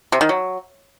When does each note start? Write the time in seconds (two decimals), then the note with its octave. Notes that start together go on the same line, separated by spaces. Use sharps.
0.12 C3
0.21 D#3
0.29 F#3